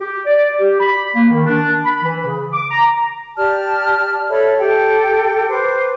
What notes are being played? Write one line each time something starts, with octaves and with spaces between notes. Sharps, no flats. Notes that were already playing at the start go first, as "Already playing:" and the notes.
G4
D5
G4
B5
A#3
D#3
D4
B5
E3
C#3
D6
A#5
G4 D5 A5 F6
A4 C#5 E5 B5
G4 A4 G5
B4 C5 D6